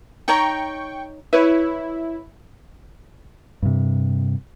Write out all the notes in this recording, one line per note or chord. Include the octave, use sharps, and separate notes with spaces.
D#4 C#5 G5 A#5 C#6
E4 B4 C#5
G2 C3